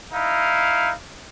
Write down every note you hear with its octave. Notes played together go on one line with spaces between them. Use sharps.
D#4 E4 F5